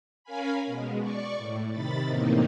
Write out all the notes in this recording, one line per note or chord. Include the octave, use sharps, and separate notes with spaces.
C#4 A#4 F5 G#5 B5
B2 G#3
D5 C#6
A2
C3 D#3 B5 A6
E2 A2 C3 A#3 D#4